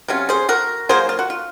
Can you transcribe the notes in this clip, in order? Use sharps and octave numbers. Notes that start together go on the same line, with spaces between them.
C3 F#3 C#4 F4
G#4 C5
F#4 A#4
F#3 A#3 F4 G#4 C5
F4
F#4
F4